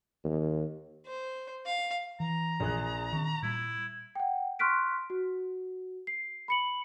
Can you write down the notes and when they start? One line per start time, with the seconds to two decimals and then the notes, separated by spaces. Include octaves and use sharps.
0.25 D#2
1.06 C5
1.66 F5
2.20 E3 A#5
2.60 A#1 G#4 F#6
3.12 D#3 C4 C#6
3.43 A#2 G3 E4
4.15 F#5 G5
4.59 C6 C#6 F6 F#6 B6 D7
5.10 F#4
6.07 C7
6.48 B5 C#7 F#7